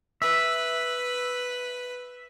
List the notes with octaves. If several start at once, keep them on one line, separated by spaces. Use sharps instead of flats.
B4 E5